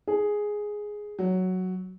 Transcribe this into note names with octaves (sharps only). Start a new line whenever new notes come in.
G#4
F#3